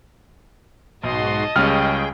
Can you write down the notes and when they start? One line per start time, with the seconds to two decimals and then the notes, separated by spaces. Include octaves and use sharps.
1.03 B1 G#2 F#4 D#5 A5 C6
1.56 C#2 G3 C#4 G#4 G5 F6